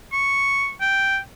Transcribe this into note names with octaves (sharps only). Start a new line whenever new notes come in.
C#6
G5